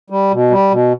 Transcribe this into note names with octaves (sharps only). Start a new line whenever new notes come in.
G3
B2
G3
B2